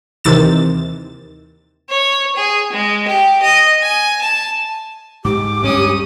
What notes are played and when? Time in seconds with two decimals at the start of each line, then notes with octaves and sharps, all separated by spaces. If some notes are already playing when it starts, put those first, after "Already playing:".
0.24 D#2 C3 D#3 E3 A6 E7
1.90 C#5
2.36 G#4
2.72 G#3
3.08 G4
3.42 D#5
3.83 G#5
4.21 A5
5.25 G#2 G4 D6
5.63 D2 G2 G#3 C#4 D#6